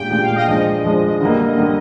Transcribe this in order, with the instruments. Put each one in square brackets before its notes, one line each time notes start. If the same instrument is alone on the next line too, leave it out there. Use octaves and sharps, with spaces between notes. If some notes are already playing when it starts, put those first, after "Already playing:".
Already playing: [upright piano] A#2 G#3 D4 G4 [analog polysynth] G5
[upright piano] A#2 G#3 D4 G4 [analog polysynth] G5
[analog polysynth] F5
D#5
[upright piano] F3 G#3 D4 [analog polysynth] D#5
[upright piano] F3 G#3 D4
D3 G3 A#3
D3 G3 A#3